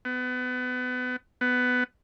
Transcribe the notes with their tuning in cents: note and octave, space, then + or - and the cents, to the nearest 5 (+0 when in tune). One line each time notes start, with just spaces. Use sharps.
B3 +30
B3 +15